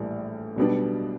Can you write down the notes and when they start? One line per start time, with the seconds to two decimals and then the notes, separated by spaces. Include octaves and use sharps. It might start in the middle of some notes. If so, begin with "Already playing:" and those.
Already playing: A#1 A2 E3 G3
0.56 B1 B2 G3 B3 D4